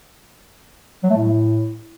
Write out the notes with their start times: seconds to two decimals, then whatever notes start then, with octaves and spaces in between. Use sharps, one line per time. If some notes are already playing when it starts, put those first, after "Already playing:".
1.03 F#3
1.10 A3
1.17 A2